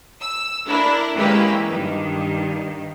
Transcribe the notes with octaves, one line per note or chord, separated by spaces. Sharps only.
E6
D4 E4 A#4
E3 G#3 A#3 C#4 G4 B4
G2 D#3